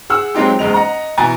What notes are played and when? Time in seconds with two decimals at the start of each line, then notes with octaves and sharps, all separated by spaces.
0.10 G#4 F#5 E6
0.35 F#3 G#3 C4 D#4 F4 G4
0.59 F#1 E2 G#3 D#5 F7
0.74 D#5 F#5 A#5
1.17 B2 E3 G#5 A#5 A6